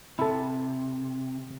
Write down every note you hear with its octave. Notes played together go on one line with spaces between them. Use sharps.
C3 E4 A4